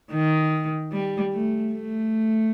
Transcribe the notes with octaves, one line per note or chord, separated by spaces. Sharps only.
D#3
G3
A3
A3